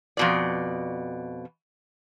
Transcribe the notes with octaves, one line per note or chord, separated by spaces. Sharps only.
F2 B2 D5